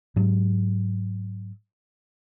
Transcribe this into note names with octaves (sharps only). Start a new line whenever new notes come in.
G#2 F#3